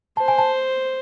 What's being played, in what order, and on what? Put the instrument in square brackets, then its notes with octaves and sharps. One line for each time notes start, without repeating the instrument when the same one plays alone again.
[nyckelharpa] C5 [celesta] A5
[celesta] G#5
A5